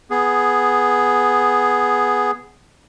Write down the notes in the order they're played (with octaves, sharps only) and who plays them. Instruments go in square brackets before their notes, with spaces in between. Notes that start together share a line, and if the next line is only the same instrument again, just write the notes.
[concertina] B3 G#4